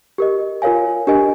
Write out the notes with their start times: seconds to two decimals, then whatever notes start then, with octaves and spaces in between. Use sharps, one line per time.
0.18 G4 A#4 D#5
0.62 F4 A#4 C#5 F5 G#5
1.07 D4 G4 A#4 D#5 G#5